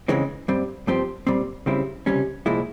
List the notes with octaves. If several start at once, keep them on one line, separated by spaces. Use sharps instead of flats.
C#3 E3 G#3 C4
G2 G3 C4
G2 F3 C4 G4 C5
A#2 G3 C4
C#3 G3 C4 E4
C#2 C3 G3 C#4
C2 A#2 F3 G#3 E4